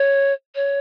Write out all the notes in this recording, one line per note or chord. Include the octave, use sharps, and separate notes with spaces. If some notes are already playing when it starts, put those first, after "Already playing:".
Already playing: C#5
C#5